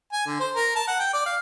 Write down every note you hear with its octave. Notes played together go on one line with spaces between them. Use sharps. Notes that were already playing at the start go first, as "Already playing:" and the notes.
G#5
D3
C5
A#4
A5
F#5
G5
D5
F5